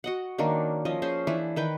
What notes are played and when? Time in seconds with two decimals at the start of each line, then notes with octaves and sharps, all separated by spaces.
0.04 F#4 D#5 F#5
0.38 D#3 A#3 C#4 D4
0.85 F3 C#4 D#5
1.02 C#4 G#4 C5
1.27 E3 D4 E4
1.56 D#3 B4 G5